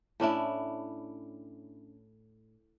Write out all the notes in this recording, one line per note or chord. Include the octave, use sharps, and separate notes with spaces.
A2 C#4 D4 E4